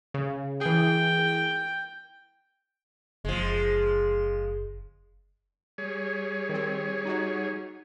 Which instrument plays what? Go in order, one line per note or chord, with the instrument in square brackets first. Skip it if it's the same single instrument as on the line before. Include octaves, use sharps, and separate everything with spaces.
[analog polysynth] C#3
[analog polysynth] E3 G#4 [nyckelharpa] G5
[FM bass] F#1 [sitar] F3 G#3
[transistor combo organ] G3 G#4 C#5
[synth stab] D#3 C4
D#4 F#4